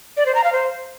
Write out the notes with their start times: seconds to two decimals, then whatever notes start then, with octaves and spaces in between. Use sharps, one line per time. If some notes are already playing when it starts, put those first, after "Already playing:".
0.17 D5
0.26 C5
0.35 A#5
0.44 F5
0.53 C5